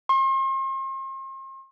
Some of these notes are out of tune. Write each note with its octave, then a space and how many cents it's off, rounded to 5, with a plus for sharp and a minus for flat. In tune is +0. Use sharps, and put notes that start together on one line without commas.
C6 +40